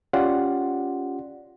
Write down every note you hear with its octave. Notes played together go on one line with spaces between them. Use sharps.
C#4 F4 G4 D5 F#5 C6